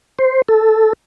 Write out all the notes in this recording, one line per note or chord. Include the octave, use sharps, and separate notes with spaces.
C5
A4